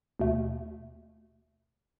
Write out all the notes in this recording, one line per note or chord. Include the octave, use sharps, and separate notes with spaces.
D#2 B2 A3